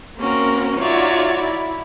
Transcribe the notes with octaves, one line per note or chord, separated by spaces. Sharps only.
A#3 C4 C#4 F#4 A#4
D#4 F4 F#4 C#5 D5 E5
E4